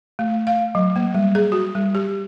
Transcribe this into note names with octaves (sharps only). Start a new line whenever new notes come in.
A3
F5
F#3
A#3
G3
G#4
F#4
G3
G4